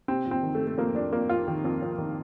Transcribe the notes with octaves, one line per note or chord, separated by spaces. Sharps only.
C3 C4
F2
C4
D#3
A3
C3
A3
F2 A#3
F2 D4
F2 A#3
F2 F4
D#3
F2
F2
D#3